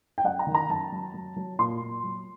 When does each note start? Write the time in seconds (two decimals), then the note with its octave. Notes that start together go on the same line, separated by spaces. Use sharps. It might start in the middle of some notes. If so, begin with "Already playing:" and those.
0.18 G5
0.24 F#2 F#5
0.39 A#5
0.47 D#3
0.54 A#5
0.69 F#2 A5
0.92 F#3
1.14 F#3
1.36 F#3
1.59 A#2 C6
1.81 A#2
2.04 F#3